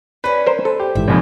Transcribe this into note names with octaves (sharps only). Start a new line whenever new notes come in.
G3 C#4 B4
A#4 C5
A4 C5
G4
A1 G#2 E3 E5
A#1 F2 G#2 C3 G#5 B5